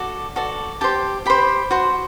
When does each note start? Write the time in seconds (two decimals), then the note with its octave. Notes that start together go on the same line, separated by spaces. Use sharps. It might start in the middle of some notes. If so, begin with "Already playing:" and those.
Already playing: F#4 A4 D5
0.36 F#4 A4 D5
0.81 G4 C5 A5
1.26 G4 C5 B5
1.71 F#4 C5